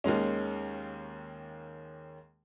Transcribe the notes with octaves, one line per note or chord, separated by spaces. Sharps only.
D#2 D#3 G#3 C#4